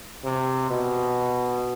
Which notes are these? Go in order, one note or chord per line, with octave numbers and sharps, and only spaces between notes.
C3
B2